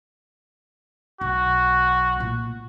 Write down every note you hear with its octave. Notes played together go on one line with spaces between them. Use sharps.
B1 F#4
A#2 A#3